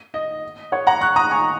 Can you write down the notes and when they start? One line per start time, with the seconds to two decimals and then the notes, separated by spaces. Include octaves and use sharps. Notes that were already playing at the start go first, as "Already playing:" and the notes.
0.14 D#5
0.72 C#5 F#5
0.87 F#5 A#5
1.01 C#6 F#6
1.16 A#5 D#6
1.31 G#5 C#6